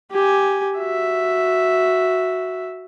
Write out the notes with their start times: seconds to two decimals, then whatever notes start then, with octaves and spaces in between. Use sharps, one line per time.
0.12 G4 G#5
0.78 F#4 E5